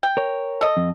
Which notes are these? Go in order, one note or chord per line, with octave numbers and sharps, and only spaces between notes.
G5
A#4 C#5
A4 D#5
F2